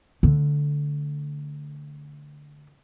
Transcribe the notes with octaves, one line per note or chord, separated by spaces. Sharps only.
D3 A3